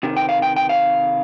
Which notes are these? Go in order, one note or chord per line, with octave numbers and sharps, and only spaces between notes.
C3 D#3
G5
F5
G5
G5
F5